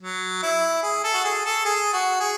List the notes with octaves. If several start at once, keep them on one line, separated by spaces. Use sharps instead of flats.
F#3
E4
G#4
A4
F#4
G#4
A4
G#4
F#4
G#4